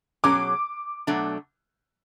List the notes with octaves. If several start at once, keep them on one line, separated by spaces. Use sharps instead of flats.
B2 F#3 C#4 G#4 D6
B2 F#3 A3 D4